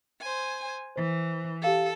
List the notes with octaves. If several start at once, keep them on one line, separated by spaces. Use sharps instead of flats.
C5 G#5
E3 C5
G4 A4 F5